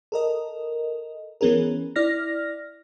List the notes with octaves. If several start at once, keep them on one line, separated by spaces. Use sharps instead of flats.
A4 A#4 D#5
E3 B3 C#4 G#4 A#4
E4 D5 F6 A#6